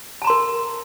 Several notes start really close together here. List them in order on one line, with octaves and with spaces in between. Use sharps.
A5 A#5 C6 A#4